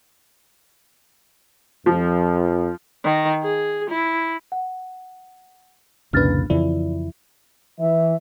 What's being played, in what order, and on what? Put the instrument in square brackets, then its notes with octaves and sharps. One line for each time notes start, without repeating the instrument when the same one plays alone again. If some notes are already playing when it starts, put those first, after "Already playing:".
[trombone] F2 [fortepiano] F3
[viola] D#3
G#4
E4
[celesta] F#5
[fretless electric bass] C2 A#2 [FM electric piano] F2 C#3 B4 [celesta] D4 F6 A6
[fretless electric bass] F2 C#3 E3 [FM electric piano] E4 [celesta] D5
[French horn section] E3 [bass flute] E5